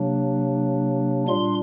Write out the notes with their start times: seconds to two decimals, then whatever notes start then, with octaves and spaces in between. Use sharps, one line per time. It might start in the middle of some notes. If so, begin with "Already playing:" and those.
Already playing: C3 F#3 A#3 D4
1.28 A#2 G3 D4 C6